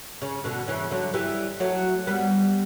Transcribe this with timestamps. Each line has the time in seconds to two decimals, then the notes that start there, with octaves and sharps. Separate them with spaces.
0.22 C#3
0.44 B2 D3
0.68 C#3 E3
0.91 D3 F#3
1.14 E3 G3
1.60 F#3 A3
2.07 G3 B3